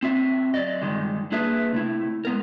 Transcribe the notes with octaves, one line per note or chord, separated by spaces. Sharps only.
C4 F#4 E5
F#3 D5 D#5
G2 D#3 G3 G#3
A#3 D4 G#4 B4 E5
C3 A3 E4
G#3 B3 A#4